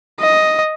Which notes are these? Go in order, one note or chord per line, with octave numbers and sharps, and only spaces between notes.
D#5